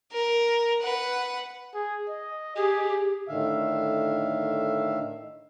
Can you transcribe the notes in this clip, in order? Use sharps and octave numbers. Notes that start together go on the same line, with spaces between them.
A#4
B4 F#5
G#4
D#5
G4 G#4
A2 D3 D#3 E5 F5